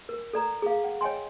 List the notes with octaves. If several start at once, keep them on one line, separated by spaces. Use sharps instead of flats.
A#4
A4 D5 A#5
G#4 F5
F#5
C#5 D#5 G5 G#5 C6